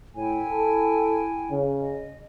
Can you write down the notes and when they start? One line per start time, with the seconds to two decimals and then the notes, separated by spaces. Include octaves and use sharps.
0.16 A2 E4 G5 G#5
0.50 A4
1.51 C#3
1.81 D#5